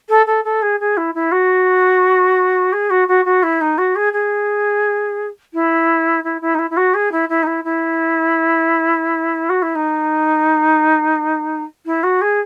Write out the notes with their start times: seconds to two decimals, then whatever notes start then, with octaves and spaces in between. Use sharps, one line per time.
0.09 A4
0.27 A4
0.45 A4
0.62 G#4
0.80 G#4
0.97 E4
1.15 E4
1.32 F#4
2.73 G#4
2.90 F#4
3.08 F#4
3.25 F#4
3.43 E4
3.61 D#4
3.78 F#4
3.96 G#4
4.13 G#4
5.54 E4
6.24 E4
6.42 E4
6.55 D#4
6.59 E4
6.71 E4
6.77 F#4
6.94 G#4
7.12 E4
7.29 E4
7.43 D#4
7.47 E4
7.64 E4
9.49 F#4
9.62 E4
9.75 D#4
11.86 E4
12.03 F#4
12.21 G#4